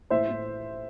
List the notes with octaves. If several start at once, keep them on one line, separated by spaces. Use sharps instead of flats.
A2 C5 E5
A2